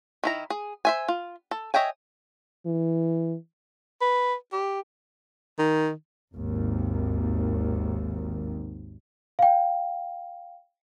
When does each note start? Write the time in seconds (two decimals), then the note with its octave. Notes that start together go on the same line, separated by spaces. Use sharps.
0.24 D#3 E4 A#5
0.50 G#4
0.85 C5 E5 G#5
1.08 F4
1.51 A4
1.74 C#5 D#5 E5 G5 G#5
2.66 E3
4.01 B4
4.52 G4
5.59 D#3
6.34 G#1 D#2
9.39 F5 G5